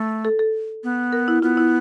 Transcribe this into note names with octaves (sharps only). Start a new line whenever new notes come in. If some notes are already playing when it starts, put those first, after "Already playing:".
Already playing: A3
A4
A4
B3
A#4
E4
B3 F4
E4